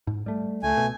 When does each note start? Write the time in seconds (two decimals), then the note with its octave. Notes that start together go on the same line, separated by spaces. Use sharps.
0.07 G#2
0.26 G3 A3
0.63 C#2 A3 G#5
0.77 B2